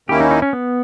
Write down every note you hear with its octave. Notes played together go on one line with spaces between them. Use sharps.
D#2 D#3 A#3 C#4 E4 G4
D#4
D#4
C#4
B3